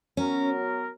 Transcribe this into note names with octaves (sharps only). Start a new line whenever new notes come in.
F#3 B3 C#4 F#4 A#4